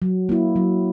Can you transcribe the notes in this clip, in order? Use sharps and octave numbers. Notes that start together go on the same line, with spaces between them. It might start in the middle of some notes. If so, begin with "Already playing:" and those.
F#3
A#3 E4
F#3